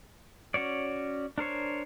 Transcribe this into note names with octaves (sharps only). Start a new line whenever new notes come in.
C#4 F#4 C#5 D5
D4 A#4 C5 C#5